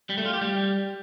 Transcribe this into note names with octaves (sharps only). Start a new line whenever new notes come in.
G3
A3
F4
G4
G3